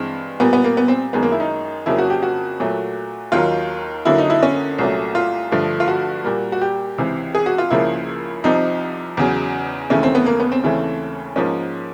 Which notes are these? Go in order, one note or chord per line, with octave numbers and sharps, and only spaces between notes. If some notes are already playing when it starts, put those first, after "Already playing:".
Already playing: G2 E3 G#3 C4
A#2 G3 A#3 B3
B3
A#3
B3
C4
F#2 D#3 G#3 B3
A#3
E4
D#4
F2 C#3 F#3 A#3 E4
F#4
G4
F#4
A#2 F#3 A3
D#2 D#3 F#3 F4
F2 D3 F#3 A#3 E4
D#4
E4
C#4
C2 A#2 F#3 A3
F4
G2 D3 F3 A3
F4
F#4
A#2 G3 A#3
F#4
G4
C#2 C3 E3
G#4
F#4
F4
C#2 C#3 F3 A#3 E4
C2 C3 F3 D#4
E2 C#3 F#3
D#2 C#3 E3 A3 C#4
C4
B3
A#3
B3
C4
D#2 C#3 E3 A3
G#2 F3 A#3 C#4